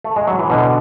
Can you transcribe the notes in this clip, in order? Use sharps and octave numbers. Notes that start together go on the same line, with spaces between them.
A3
G#3
F#3
E3
B2 D3